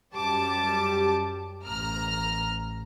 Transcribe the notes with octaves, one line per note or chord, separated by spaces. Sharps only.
F#2 G3 G4 A5 D6
A1 A#5 F6